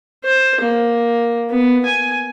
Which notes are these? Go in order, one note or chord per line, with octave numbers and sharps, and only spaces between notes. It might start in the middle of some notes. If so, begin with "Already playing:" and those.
C5
A#3
B3
G#5